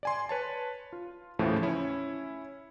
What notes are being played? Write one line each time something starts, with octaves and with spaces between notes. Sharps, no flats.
D5 G#5 C6
B4 C#5 A5
F4
D#2 A2 C#3 E3 F3 A3
C#4 E4 C#5